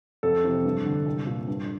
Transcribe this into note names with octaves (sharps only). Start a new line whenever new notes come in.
F2 A4
C3 E3
G2
D3
C2
A#2
G2